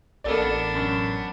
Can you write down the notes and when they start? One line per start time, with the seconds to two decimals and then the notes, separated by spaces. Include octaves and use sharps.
0.24 A1 A#3 B3 D4 A4 D5
0.75 F#2